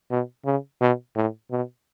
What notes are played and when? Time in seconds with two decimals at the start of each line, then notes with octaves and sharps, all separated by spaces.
0.11 B2
0.46 C#3
0.81 B2
1.16 A2
1.51 B2